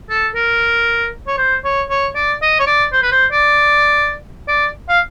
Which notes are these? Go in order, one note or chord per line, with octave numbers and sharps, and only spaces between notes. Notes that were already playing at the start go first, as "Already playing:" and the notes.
A4
A#4
C#5
C5
C#5
C#5
D5
D#5
C#5
D5
C5
B4
C5
D5
D5
F5